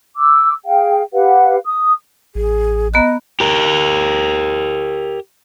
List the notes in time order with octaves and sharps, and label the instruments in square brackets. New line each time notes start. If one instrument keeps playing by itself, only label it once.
[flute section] D6 E6
G#4 F5 G5
G4 B4 F5 F#5
D#6
[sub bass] A1 [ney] G#4
[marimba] B3 A#5 F#6 [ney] D#5
[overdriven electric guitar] G4 A#4